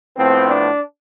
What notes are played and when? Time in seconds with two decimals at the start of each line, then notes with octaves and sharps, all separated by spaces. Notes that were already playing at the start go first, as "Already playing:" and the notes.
0.16 A2 F3 B3 C4
0.48 D4